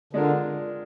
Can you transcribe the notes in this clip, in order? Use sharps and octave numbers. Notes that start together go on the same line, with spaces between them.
D3 G#3 D4 F4 A#4